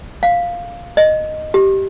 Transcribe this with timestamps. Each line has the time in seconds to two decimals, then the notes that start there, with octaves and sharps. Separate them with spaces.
0.23 F5
0.97 D#5
1.54 G4